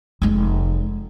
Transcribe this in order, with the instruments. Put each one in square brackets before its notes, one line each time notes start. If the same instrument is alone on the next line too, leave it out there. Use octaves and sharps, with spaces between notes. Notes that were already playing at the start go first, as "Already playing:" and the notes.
[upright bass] F1 G#3